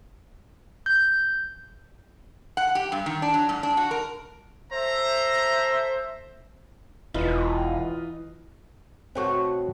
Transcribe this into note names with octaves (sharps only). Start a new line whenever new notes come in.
G6
F#5
G4
G2
D#3
D4
F#3
G#2
D4
F#4
A#4
A4 C5 E5 A#5
E1 E3 D#4 F4 B4
B2 A3 C4 F#4 C#5 F#5